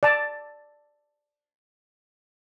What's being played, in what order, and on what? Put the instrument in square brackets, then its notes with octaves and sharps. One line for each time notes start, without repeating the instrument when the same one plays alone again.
[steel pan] D5 A5